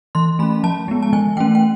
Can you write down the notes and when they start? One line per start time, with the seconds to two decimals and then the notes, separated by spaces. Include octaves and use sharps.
0.15 E3 C6
0.39 A3 B5
0.42 C#4
0.64 F3 A5
0.88 G#3 B3
1.03 A5
1.13 E3 G#5
1.37 A3 C#4 G5
1.55 G5